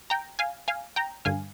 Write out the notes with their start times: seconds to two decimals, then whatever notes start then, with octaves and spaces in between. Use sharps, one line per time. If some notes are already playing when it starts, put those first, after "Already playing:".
0.10 G5 A#5
0.39 F5 G#5
0.68 F5 G#5
0.96 G5 A#5
1.25 G2 D3 F5 G#5